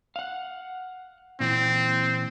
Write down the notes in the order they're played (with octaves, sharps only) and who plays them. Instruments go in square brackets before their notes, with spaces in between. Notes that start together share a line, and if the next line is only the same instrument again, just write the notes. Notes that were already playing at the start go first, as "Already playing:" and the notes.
[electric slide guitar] F5 F#5
[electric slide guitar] A#2 E3 [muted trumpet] C4